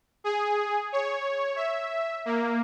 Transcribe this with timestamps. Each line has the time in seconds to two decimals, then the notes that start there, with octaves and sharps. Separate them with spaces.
0.24 G#4
0.92 C#5
1.56 E5
2.25 A#3